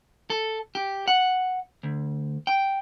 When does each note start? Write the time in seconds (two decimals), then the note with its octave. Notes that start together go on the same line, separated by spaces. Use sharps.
0.30 A4
0.75 G4
1.08 F#5
1.83 D2
2.47 G5